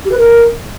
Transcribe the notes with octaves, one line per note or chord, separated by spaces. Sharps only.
G4
B4
A#4